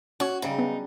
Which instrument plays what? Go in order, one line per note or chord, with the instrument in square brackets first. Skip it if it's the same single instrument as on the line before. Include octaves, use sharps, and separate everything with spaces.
[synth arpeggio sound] C#4 C#5 [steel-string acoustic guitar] F#4
[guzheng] C#3 F#3 G3 [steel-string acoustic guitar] D#4
[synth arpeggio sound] B3 [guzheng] D4